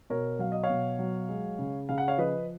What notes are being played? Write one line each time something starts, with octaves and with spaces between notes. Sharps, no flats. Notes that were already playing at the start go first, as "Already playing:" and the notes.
B2 A#4 C#5
F#3 F5
D#5
C#5 F5
B2
F#3
G#3
C#3
C#3 F5
F#5
C#5 F5
F3 B4 D#5